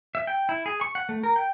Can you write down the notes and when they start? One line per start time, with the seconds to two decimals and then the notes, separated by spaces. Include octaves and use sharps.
0.15 E5
0.27 G5
0.49 E4
0.66 G#4
0.81 C#6
0.95 F#5
1.09 A3
1.23 A#4
1.36 G5